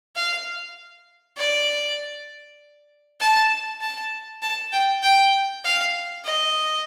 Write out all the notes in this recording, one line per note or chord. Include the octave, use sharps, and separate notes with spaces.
F5
D5
A5
A5
A5
G5
G5
F5
D#5